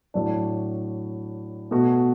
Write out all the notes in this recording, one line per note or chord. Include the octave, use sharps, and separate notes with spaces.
A2 F#3 D4
B2 A3 F#4